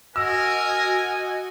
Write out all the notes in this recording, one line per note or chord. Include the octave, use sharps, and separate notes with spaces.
F#4 A#4 D#5 G#5 E6